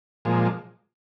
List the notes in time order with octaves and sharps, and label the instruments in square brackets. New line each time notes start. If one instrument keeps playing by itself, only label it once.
[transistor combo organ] A#2 F3 G#3